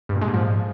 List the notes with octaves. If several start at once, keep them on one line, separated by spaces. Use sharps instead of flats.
G2
A#2
G#3
G#2
F3